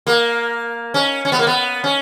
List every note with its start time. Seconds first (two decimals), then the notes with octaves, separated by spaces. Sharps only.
0.07 A#3
0.94 C#4
1.25 C#4
1.32 B3
1.39 A#3
1.47 B3
1.84 C#4